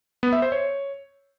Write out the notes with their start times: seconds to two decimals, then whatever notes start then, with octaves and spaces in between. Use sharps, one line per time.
0.23 B3
0.33 E5
0.42 C5
0.52 C#5